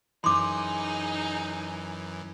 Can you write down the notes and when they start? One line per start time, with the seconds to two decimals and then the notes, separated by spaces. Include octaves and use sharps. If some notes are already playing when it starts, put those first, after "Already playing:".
0.24 F#2 E3 D#4 G#4 C6 D6